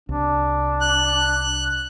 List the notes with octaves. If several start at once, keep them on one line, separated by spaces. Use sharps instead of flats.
C2 D4
F#6